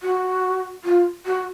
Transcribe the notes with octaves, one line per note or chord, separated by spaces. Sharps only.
F#4
F4
F#4